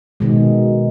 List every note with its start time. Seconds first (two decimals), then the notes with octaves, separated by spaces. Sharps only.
0.20 B2 D#3 G#3